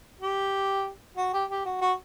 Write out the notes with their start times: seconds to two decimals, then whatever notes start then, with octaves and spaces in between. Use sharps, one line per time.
0.21 G4
1.17 F#4
1.34 G4
1.50 G4
1.66 F#4
1.81 F#4